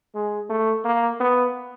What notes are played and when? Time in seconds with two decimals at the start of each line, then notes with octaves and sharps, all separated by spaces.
0.15 G#3
0.50 A3
0.85 A#3
1.20 B3